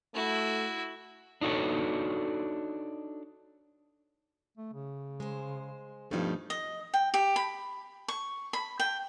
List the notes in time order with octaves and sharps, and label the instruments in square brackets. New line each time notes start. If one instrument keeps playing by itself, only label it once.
[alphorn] A3 [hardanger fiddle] E4 F#4
[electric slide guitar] D4 D#4 F#4 A4 C#5
[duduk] A3
C#3
[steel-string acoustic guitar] G#3 C5
[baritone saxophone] G2 [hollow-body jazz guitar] B2 F3 [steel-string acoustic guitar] A3 D#4
[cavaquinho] D#5
G5
G4
B5
C#6
B5
G5